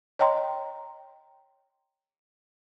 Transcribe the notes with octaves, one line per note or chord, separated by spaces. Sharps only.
C#5 D#5 G5 A#5 C6